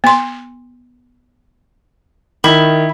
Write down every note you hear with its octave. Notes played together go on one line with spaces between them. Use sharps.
B3 C6
D#3 E4